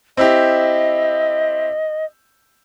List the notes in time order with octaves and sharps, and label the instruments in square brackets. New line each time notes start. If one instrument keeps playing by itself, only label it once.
[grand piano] C4 E4 G4 [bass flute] D#5